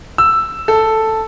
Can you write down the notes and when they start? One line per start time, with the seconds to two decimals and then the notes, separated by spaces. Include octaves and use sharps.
0.18 E6
0.68 A4